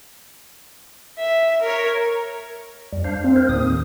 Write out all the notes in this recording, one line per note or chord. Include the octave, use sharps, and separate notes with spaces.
E5
A#4 C#5
F2 G3
D4 C5 F5
C4
A#4 C5
D#2 A2 D#6